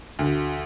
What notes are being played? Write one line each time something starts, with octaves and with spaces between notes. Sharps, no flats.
D2